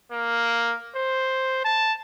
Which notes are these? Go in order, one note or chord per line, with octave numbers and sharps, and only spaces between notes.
A#3
C5
A5